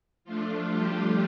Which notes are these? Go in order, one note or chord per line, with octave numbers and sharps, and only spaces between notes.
F3 A3 D4 F4
G3 G4